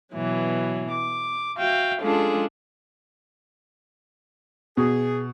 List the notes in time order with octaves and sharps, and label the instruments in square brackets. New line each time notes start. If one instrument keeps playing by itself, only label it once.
[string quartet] B2 E3 F#3
D6
F#4 E5 F5 G5
G#3 C#4 D4 F4 G#4 A4
[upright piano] B2 [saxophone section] G#4